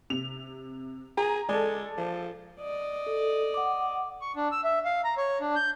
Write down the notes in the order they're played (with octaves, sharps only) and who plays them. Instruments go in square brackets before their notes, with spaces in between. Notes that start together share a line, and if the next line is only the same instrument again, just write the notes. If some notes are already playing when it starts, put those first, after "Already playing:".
[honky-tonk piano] C3 F7
[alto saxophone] G#4 [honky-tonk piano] A#5
[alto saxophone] G#3 [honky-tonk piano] A4 D5
[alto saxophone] F3
[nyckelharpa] D5 D#5
[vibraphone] A4
F#5 D6
[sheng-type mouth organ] C#6
D4
E6
E5
F5
A#5
C#5
D4
G6